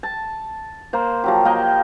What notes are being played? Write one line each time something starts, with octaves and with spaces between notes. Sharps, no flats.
A5
A#3 C5
F3 F#3 G4
A#3 D#5 G5